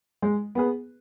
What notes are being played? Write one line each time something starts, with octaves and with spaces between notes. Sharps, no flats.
G#3
B3 G#4 B4